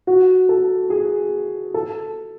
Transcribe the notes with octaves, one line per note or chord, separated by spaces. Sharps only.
F#4
A4
G#4
A4